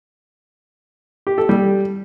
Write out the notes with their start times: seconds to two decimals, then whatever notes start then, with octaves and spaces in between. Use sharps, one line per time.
1.27 G4
1.38 A4
1.49 G3